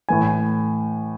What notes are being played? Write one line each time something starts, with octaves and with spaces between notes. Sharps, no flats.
A2 E3 A3 G#5